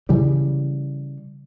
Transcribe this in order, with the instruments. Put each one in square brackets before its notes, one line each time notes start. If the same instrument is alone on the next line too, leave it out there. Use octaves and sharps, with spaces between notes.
[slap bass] C#3 E3 G3